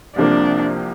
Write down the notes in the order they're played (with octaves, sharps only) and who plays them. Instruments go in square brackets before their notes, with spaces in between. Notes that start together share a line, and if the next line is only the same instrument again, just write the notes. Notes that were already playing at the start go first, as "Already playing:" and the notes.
[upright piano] C2 C3 F3 A#3 [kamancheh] D4